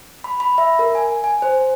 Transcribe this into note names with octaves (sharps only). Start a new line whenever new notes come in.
B5
B5
E5
A#4
G#5
G#5
C5